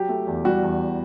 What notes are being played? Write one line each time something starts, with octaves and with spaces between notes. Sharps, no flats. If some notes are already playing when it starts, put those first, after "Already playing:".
Already playing: F#3 G4
A3
E2
G3 F#4
E2